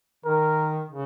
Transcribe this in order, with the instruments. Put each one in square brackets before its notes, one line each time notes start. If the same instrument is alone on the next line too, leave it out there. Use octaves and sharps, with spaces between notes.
[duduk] D#3 [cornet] A#4
[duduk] C#3